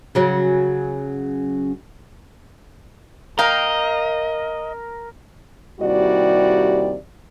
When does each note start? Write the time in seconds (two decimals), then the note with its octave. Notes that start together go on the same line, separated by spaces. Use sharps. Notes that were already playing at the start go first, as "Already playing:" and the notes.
0.15 C#3 F#3 C#4
3.39 A#4 D#5 F5 G5
5.80 D#2 C3 G3 E4 F#4 D5